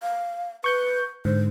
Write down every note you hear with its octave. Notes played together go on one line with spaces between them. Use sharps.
F5
B4 C#6 G6 C#7
G#2 D3 C5